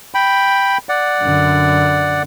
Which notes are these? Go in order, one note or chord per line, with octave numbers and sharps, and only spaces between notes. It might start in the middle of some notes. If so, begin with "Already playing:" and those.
G5 B5
D5 F#5
F#2 D3